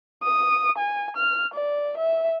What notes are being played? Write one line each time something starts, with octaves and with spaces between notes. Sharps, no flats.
D#6
G#5
F6
D5
E5